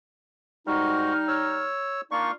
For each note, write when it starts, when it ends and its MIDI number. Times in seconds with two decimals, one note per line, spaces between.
0.67 1.13 44
0.67 1.69 55
0.67 1.13 56
0.67 1.69 63
0.67 1.13 66
0.67 1.69 89
1.28 2.01 73
1.28 2.01 88
2.11 2.32 58
2.11 2.30 62
2.11 2.30 63
2.11 2.30 65
2.11 2.32 85